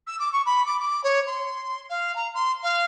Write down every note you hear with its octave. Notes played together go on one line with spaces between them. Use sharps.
E6
D6
C#6
B5
D6
D6
C#5
C6
F5
A#5
C6
F5